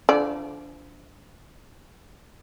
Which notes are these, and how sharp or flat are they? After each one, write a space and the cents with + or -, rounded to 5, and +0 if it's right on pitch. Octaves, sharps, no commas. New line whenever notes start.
D3 -25 F3 -35 D5 +0